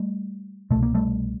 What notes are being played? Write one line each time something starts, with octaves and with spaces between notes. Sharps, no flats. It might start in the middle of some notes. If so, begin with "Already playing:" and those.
Already playing: G3 A3
C2 B2 A3
A#3
G3 A3